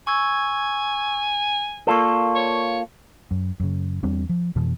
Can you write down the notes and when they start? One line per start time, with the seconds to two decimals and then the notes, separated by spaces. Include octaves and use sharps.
0.07 G#5 C#6 E6 G#6
1.87 A#3 F4 A4 A#4 D5 C#6
2.35 C#5
3.31 F#2
3.60 F#2 C#3
4.03 E2 G3 C4 D4
4.29 F3
4.55 F2 B2 E3